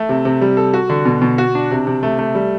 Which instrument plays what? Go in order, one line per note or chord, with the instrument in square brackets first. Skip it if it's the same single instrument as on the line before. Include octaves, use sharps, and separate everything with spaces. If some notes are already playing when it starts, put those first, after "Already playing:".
Already playing: [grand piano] A3
C3
C3
G3
A4
F#4
D3
B2
B2
F#4
D4
C3
C3
A3
A3
G3